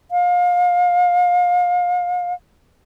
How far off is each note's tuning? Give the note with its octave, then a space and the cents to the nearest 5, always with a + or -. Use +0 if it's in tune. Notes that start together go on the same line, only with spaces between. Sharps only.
F5 +30